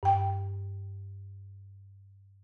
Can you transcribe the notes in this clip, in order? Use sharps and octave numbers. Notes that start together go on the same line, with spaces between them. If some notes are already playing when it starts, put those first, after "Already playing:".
G2 G5